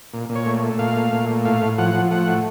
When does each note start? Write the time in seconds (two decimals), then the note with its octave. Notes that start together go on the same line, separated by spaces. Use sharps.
0.13 A#2
0.29 A#2
0.35 C#5
0.46 A3
0.63 A3
0.79 A#2 F5
0.96 A3
1.13 A#2
1.29 A3
1.45 A2 F5
1.62 A2
1.78 F3 F#5
1.94 F3
2.11 A3 F#5
2.28 A2